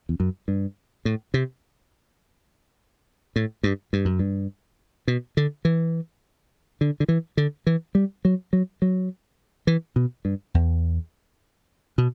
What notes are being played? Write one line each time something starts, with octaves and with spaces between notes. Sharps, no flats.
E2
F#2
G2
A2
C3
A2
G2
G2
F#2
G2
B2
D3
E3
D3
D3
E3
D3
E3
G3
F#3
F#3
F#3
E3
B2
G2
E2
B2